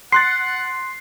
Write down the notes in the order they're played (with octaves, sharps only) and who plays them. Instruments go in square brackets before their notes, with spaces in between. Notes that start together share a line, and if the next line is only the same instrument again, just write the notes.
[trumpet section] F#5 [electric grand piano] C6 F#6 A6 [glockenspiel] C7